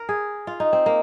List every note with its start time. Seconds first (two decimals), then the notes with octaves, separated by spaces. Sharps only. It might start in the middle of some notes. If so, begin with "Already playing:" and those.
Already playing: A#4
0.09 G#4
0.47 F4
0.60 D#4
0.73 C4
0.86 A#3